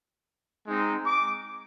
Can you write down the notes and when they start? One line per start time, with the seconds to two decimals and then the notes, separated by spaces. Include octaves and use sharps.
0.66 G#3 C4 D#4
1.06 D6